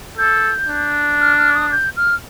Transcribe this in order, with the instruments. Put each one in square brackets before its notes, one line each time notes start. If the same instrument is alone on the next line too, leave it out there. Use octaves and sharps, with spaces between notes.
[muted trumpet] A4 [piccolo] G6
[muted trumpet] D4
[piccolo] F6
F6
D#6
G6
F6